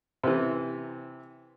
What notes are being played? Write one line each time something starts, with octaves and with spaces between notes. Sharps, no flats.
C3 E3